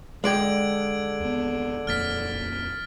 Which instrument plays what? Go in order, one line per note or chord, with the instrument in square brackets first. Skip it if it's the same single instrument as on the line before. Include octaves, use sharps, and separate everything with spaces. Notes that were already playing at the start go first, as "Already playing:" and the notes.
[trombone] D3 [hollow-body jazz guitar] G#3 D5 G5 [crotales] G#6 D7 F#7
[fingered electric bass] D#2 B3
[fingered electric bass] D#1 F2 A#3 [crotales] F6 A6 B6